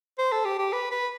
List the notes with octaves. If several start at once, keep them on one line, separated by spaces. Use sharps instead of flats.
C5
A4
G4
G4
B4
B4